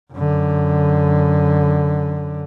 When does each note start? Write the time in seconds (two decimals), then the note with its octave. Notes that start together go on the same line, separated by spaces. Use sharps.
0.13 F#2 D3